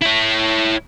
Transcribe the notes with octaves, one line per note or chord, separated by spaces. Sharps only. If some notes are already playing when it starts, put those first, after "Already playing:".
E4 C#5